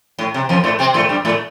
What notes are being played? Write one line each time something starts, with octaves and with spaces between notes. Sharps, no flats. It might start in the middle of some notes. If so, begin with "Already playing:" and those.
A2
C3
F2 F3
A2 A3
C3 C4
A2 A3
G2 G3
A2 A3